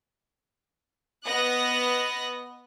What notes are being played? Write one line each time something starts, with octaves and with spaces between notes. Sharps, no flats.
B3 D#5 D#6 F#6 A#6